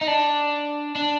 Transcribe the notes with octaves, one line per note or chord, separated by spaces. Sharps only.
D#4
D4
D4